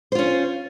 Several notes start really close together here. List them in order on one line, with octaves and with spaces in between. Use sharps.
C5 F4 C#4